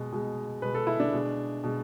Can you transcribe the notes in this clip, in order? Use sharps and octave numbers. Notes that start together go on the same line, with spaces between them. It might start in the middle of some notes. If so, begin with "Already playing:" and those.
Already playing: B2 G#3
B2 G#3
B2 G#3 B4
A4
E4
D4
B2 G#3
B2 G#3